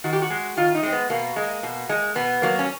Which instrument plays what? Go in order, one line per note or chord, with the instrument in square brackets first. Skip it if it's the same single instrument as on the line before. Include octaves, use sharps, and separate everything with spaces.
[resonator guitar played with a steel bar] D#3 F#4
G4
F#4
G#3
D#3 F4
D#4
G#3 C4
B3
B2 A#3
G#3
B2
G#3
B2 B3
F#3 A#3
C#4